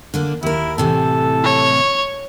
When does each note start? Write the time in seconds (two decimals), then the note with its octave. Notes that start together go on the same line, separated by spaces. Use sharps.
0.14 D3 A#3 D4
0.43 D#2 E4 A#4
0.78 A2 C3 E3 A4
1.44 C#5